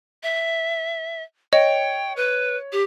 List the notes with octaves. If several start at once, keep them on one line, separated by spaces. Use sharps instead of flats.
E5
C#5 D#5 G5
B4
G4